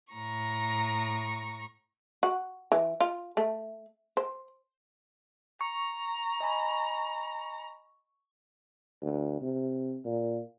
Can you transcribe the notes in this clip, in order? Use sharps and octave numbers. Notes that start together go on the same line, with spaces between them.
A2 A#5 C#6
F#4
E3
F4
A3
C5
A#5 C#6
D#5 G#5 B5
D2
C3
A#2